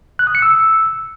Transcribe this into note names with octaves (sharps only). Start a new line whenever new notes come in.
F#6
D#6
C#7
E6